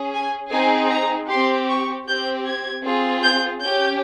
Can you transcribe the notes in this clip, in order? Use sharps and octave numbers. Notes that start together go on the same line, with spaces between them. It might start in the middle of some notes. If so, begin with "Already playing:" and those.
Already playing: C#4 G#4
G#5
C4 D#4 G#4 G#5
A#5
C4 G4 C6
C#6
C4 G4 G6
G#6
C4 F4 G#4
G6
C#4 G4 G6